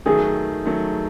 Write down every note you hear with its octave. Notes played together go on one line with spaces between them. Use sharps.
D#3 F#3 A3 G#4
D#3 F#3 A3